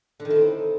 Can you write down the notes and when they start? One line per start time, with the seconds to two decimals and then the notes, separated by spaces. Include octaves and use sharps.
0.20 D3
0.25 D#3
0.30 E4
0.36 C4
0.41 D#4